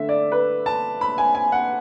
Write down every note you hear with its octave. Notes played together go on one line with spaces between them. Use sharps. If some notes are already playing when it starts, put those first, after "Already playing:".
Already playing: D3 A3 E5
D5
B4
A5
B5
G#5
G#5
F#5